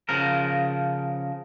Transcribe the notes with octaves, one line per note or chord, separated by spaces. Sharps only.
C#3 F3 A#4